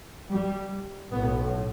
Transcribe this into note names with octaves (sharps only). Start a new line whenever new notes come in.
G3
B1 A2 B3